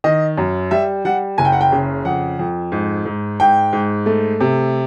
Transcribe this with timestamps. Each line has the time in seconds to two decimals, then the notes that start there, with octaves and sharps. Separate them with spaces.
0.04 D#3 D#5
0.38 F#2
0.71 G3 E5
1.05 G3 F#5
1.38 F#1 G#5
1.45 G5
1.52 F#5
1.61 G5
1.72 C#3
2.05 F2 F#5
2.39 F2
2.72 G#2
3.05 G#2
3.40 G#2 G5
3.73 G#2
4.06 A3
4.40 C3